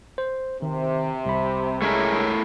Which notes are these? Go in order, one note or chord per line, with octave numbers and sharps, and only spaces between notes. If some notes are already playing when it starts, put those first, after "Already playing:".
C5
C3 D#3
C2 B5
G#3 A3 C#4 E4 A#4